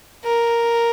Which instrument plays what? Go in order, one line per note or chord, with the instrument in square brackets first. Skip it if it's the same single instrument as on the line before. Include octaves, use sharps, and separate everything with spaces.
[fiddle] A#4